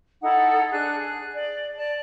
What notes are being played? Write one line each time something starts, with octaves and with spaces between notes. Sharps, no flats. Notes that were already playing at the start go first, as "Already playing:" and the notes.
D#4 E4 A4 F#5
D4 G#4 F#6
G#4
D5
D5 A5